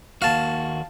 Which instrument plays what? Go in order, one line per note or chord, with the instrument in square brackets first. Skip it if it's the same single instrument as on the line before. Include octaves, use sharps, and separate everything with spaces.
[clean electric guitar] D#2 A#3 F#4 [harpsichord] F5 A5